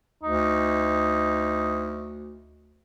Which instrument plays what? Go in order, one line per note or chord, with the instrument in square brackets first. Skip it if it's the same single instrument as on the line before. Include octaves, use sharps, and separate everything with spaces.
[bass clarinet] D2 [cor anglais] D#4